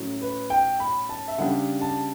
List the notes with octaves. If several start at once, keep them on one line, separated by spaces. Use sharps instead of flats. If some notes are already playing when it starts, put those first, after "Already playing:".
Already playing: A2 F#3 C#4
B4
G5
B5
A5
E5
C#3 G3 D4 F#5
A5